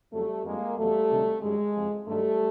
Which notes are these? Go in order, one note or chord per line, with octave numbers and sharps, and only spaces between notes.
F2 C#3 F#3 G3 A3
F2 D3 G3 G#3 A#3
E2 B2 F#3 G3 A3
D2 C3 D#3 F#3
F#2 D#3 G3 G#3
F2 C3 F3
G2 D#3 F#3 G3 A3